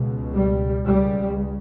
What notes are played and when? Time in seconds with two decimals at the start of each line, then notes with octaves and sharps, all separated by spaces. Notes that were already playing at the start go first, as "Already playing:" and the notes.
Already playing: C#2 B2
0.33 G3
0.87 C#2 C#3 G3